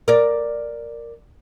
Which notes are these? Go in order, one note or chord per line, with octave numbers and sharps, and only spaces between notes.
A#4 D5